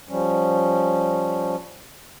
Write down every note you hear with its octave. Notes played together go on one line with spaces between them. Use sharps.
F3 G3 C#4